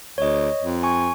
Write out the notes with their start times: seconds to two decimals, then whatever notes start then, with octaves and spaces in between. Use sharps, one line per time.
0.18 D2 C#5 D#5
0.63 F2
0.83 G#5 C#6